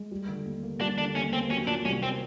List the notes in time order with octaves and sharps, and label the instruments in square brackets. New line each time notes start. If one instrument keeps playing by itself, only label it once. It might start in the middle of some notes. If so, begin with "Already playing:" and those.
Already playing: [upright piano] G#3
G3
D3
D#2
A#3
[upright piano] G3 [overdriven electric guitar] D4
[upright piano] D3 [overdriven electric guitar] D4
[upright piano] D#2 [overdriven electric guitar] C#4
[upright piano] A#3 [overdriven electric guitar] C4
[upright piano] F#3 [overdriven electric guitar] C#4
[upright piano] A#2 [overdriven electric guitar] D4
[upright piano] C2 [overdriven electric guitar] C#4
[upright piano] A#3 [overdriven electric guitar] C4